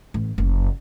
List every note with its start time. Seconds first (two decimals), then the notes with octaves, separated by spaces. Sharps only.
0.14 A1
0.38 F#1